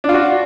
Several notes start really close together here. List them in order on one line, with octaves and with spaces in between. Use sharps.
D4 F4 F#4